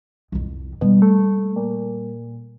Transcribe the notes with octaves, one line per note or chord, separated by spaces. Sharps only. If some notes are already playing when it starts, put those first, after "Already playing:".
C2 F2
B2 G3 A#3
A3
A#2